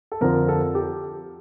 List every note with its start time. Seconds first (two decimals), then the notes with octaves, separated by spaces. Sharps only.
0.12 A4
0.21 F2 D3 F3 A#4
0.48 A4
0.75 G4